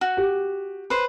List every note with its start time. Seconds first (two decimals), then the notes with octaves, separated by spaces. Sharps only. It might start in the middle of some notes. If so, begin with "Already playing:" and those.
0.01 F#4
0.17 G4
0.90 B4 C5